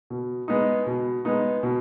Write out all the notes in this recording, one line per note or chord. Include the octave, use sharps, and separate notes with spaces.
B2
G#3 B3 D#4
B2
G#3 B3 D#4
B2